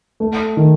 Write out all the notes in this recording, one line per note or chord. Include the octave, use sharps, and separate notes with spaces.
A3
D#3